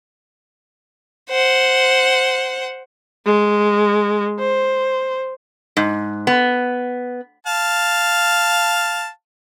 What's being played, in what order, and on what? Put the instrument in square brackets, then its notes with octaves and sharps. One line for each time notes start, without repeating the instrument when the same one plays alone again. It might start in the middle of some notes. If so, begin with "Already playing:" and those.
[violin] C5 F#5
[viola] G#3
C5
[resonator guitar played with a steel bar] G#2
B3
[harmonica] F5 A5